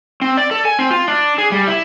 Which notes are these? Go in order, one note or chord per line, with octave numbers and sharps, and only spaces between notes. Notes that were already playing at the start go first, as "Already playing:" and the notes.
C4
D5
A4
G#5
C4
F4
D4
G#4
G3
E4